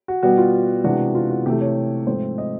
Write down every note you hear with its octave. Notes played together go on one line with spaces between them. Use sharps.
F#4
B2 G3 B3 F#4
F4
C3 E3 G#3 B3 D4 F#4
F4
F#4
C3 E3 A3 G4
C#5
G#2 F3 A3 C4 C5
D#5